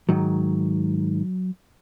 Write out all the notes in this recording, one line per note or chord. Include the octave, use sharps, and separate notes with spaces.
G#2 D#3 F#3